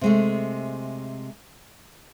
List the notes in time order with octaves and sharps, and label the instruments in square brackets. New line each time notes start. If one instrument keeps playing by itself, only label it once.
[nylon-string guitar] C3 G#3 A3